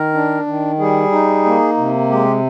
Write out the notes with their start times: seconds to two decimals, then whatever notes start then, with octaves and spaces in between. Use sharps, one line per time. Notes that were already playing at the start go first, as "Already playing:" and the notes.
Already playing: D#3 A#4
0.14 D4
0.47 D#3
0.79 G3 G#4
1.11 D#4
1.45 A#3
1.77 C3
2.09 G#3 G4